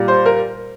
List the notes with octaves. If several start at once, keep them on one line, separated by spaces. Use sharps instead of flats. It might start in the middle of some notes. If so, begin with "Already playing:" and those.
Already playing: A#2 G3
C5
A#4